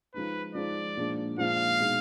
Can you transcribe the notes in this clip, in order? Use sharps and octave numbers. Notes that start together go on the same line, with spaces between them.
F3 G#3 D#4 B4
F3 G#3 D#4 D5
A#2 F3 G#3 D4
A#2 F3 G#3 D4 F5
B2 G#3 D#4